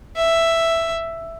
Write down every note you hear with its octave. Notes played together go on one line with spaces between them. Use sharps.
E5